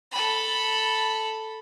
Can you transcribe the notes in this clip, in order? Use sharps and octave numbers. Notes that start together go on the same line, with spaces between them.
A4 B5